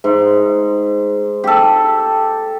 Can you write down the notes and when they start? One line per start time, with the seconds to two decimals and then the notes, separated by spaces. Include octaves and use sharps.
0.04 G#2
1.44 G4 A4